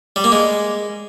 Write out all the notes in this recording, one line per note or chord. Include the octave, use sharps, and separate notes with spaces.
G3
A#3
G#3